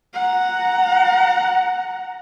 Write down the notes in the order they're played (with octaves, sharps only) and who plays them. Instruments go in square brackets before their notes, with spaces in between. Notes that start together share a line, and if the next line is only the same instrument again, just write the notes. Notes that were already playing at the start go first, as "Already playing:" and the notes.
[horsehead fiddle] F#5 A#5